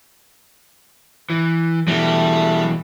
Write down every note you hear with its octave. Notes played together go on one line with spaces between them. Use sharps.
E3
B2 E3 G3 A3